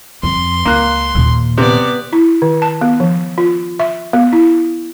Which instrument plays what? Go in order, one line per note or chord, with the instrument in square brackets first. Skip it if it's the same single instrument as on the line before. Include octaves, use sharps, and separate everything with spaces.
[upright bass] F2 [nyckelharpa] C6
[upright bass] C#2 [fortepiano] A#3 F#6
[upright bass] D#2 A#2
[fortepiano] C3 [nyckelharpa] B3 D5
[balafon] E4
D#3
A5
B3
F3
F4
E5
B3
E4